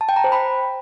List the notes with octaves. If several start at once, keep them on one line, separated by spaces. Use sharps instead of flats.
A5
G5
A#5
C5
B5